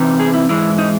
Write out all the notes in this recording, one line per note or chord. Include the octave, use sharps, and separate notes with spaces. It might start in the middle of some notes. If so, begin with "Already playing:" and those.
Already playing: C3 E3 C4 D#4
G#4
E4
G#2 E3 G#3 E4
D#4